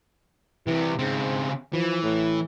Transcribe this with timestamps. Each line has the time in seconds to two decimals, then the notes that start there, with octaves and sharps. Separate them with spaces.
0.67 C2 C3 E3
0.99 G#2 C#3 C4
1.73 E3 F3
2.03 A2